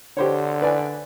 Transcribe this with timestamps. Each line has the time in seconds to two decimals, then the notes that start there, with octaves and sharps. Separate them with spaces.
0.17 D3 G4 C5 C#5
0.62 B4 D5 G#5